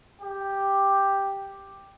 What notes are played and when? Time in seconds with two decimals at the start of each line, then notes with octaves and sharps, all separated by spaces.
0.21 G4